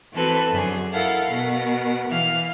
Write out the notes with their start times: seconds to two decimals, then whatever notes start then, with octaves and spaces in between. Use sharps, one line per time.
0.13 E3 C4 F#4 A4 B4
0.50 F#2 D3 G#4
0.92 E4 A4 A#4 F5 F#5
1.30 B2 A#4 F#5
2.08 E3 F5 F6